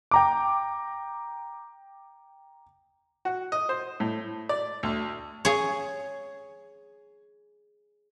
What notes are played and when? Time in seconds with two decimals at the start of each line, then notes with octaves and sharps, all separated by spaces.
0.11 G5 A#5 D6
3.25 F#4
3.52 D#5
3.69 C5
4.00 A2
4.49 D5
4.83 D2
5.45 G#4 C#5